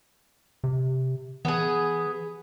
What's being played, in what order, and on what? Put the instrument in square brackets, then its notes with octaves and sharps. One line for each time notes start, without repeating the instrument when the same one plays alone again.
[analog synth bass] C3
[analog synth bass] E3 [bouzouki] B3 G#4